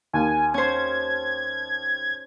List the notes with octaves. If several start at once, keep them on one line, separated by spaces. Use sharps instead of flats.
D#2 G#5
C#4 C5 G#6